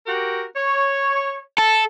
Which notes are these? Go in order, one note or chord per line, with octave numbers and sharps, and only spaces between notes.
F#4 G4 A#4
C#5
A4